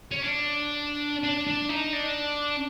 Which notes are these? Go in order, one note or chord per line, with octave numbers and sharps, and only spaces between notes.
C#4
D4
D4
D4
D#4
D4